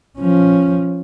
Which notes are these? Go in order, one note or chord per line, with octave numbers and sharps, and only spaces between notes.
F3 C#4